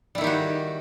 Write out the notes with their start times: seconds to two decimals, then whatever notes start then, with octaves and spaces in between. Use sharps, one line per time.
0.15 G3
0.18 E4
0.21 D#3
0.24 G4
0.27 F#4